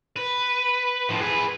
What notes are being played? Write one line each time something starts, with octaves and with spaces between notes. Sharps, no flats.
B4
A2 F3
G#4 B4